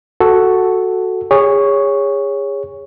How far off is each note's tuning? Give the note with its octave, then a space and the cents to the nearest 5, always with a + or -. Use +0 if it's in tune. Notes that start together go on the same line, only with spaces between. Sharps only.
F#4 +0 A4 +0
G#4 -30 C#5 +5